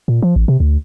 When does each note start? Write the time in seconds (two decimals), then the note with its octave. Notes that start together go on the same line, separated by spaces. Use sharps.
0.08 A#2
0.22 F3
0.36 A1
0.48 C3
0.60 D2